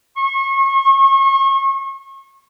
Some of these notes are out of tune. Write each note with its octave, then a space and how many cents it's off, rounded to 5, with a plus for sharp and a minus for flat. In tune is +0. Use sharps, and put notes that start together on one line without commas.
C#6 -35